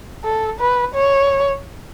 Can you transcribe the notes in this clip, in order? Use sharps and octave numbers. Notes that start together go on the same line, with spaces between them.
A4
B4
C#5